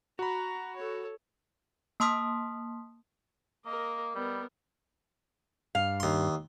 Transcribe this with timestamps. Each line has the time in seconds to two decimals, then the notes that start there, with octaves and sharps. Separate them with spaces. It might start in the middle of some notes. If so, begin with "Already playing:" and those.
0.19 F#4 A#5 B5
0.76 A4 C#5
2.00 A#3 A5 C6 D#6 F6 B6
3.66 A#3 A#4 D#5
4.15 G3 B3 A#4
5.75 G2 F5
6.00 D#2 C6